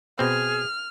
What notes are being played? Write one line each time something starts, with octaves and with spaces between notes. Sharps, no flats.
B2 C4 G#4 F6